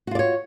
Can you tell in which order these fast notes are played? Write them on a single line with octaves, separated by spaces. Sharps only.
F#4 F4 D5 C#5